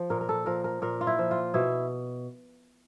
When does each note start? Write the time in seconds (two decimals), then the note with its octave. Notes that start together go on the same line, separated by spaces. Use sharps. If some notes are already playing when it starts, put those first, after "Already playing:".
Already playing: F3
0.10 A#2 A#4
0.21 A#4
0.29 A4
0.46 F3 A#4
0.64 A#4
0.82 A#2 A#4
1.01 F4
1.07 E4
1.19 F3
1.31 F4
1.54 B2 E4